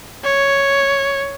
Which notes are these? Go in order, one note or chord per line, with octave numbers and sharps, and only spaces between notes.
C#5